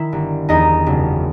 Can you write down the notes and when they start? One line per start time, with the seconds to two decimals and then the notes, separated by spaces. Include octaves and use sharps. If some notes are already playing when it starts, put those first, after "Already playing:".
Already playing: D#3 E4 E5
0.12 G1
0.49 E2 D#4 D#5
0.86 F#1